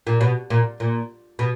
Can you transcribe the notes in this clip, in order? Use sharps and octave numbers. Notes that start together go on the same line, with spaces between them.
A#2
B2
A#2
A#2
B2